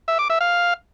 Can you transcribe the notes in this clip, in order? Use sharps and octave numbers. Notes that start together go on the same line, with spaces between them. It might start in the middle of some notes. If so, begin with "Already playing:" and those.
E5
D6
E5
F5